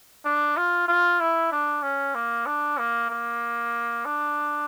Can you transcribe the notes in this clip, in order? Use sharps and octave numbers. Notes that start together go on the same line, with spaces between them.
D4
F4
F4
E4
D4
C#4
A#3
D4
A#3
A#3
D4